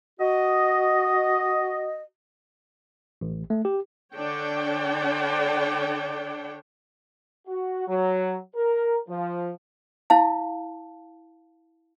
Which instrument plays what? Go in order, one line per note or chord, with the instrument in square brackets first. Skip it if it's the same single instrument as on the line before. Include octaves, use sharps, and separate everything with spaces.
[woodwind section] F#4 D#5
[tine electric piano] A1
A3
G4
[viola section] D3 D4 C#5 G5
[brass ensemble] F#4
F#3
A#4
F3
[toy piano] E4 F5 A5